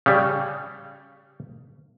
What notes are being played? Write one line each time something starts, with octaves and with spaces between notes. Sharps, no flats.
C#3 G3